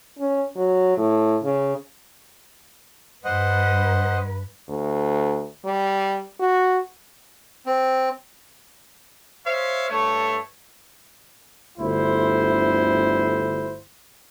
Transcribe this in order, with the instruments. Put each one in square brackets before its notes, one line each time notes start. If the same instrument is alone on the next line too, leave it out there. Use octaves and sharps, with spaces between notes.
[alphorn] C#4
F#3
A2
C#3
[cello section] G2 B4 [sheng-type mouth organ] C5 D#5 F#5
[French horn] D2
G3
F#4
[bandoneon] C4
[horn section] C5 C#5 E5 F5
G2 A3 A4 C#5
[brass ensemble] G1 D2 E4 C5